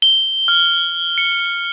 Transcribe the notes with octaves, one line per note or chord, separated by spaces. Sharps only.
G7
F6
C#7